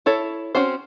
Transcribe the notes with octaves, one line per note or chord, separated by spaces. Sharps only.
E4 A4 C#5
C4 C#4 F#4 C5